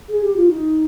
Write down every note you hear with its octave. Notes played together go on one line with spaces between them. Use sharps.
G#4
G4
F4
D#4